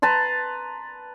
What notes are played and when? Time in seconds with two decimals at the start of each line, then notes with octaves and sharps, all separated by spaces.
0.02 B4 A5 A#5 C6